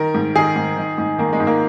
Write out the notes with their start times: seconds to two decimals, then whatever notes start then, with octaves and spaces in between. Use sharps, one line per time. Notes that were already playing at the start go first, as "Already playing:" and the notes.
Already playing: D#3 A#4
0.14 G#2
0.36 D#3 G#4
0.56 G#2
0.77 D#3
0.98 G#2
1.18 D#3 A#3
1.33 G#3
1.40 G#2
1.47 A#3